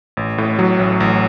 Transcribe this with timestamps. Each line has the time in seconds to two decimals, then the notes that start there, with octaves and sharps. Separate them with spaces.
0.17 A1
0.38 A2
0.59 F#3
0.80 A1
1.00 A1